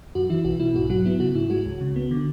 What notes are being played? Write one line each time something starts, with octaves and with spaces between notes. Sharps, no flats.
F#2 F#4
E3 E4
B1 F#4
B2 E4
G#2 F#4
F#3 F#4
B3 E4
C#3 F#4
G#2 E4
G#3 F#4
C#2
C#3
B3
D3